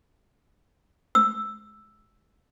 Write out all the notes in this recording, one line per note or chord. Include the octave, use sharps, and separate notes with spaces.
E6